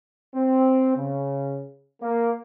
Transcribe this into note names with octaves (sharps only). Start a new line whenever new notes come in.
C4
C#3
A#3